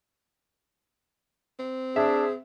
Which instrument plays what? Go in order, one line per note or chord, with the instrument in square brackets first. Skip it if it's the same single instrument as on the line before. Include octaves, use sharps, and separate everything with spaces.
[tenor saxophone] C4
[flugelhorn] D4 [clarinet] G#4 [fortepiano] E5